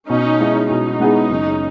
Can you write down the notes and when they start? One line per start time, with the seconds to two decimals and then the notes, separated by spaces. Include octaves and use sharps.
0.09 B2 C#4 D#4
0.40 G#3 B3 E4 G#4
0.70 B2 C#4 D#4
1.00 G#3 B3 E4 G#4
1.29 F#1